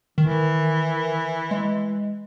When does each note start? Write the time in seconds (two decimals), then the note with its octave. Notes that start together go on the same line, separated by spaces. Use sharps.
0.18 D#3 E3
1.51 G#3